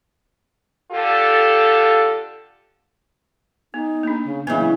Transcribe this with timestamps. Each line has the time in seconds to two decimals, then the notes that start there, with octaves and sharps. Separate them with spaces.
0.92 D3 F4 G4 A4
3.74 B3 D#4
4.03 A#3 D4
4.24 C#3
4.47 C#3 E3 F#3 A#3 B3 E4